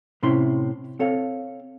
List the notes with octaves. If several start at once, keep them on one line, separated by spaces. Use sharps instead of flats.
A2 C3 C#4 E4 C6
C4 A4 C#5 F5